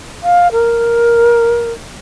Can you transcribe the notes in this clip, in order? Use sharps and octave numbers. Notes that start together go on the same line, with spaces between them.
F5
A#4